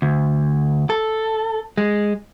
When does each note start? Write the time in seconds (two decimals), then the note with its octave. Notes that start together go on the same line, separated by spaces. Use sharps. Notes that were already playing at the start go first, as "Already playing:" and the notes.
0.02 D2
0.90 A4
1.78 G#3